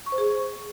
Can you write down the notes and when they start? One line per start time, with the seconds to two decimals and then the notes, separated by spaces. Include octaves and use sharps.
0.06 C#6
0.12 C5
0.18 G#4